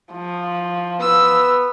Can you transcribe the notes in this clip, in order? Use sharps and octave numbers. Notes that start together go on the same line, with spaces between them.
F3
B3 E6